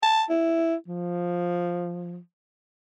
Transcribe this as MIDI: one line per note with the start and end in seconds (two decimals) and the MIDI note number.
0.03 0.24 81
0.30 0.75 64
0.88 2.19 53